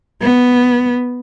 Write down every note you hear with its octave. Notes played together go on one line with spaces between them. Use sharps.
B3